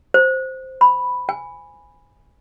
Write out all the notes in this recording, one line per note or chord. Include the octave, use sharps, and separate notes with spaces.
C5
B5
G#5